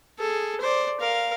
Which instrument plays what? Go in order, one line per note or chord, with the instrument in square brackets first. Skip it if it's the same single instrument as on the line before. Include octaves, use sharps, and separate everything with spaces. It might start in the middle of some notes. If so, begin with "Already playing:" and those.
[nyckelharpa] G#4 A4
C5 D5
A#4 F5